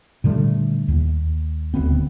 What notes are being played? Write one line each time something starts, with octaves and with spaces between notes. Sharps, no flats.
A#2 D3 G3 A3
D#2
D#1 D2 B3 C4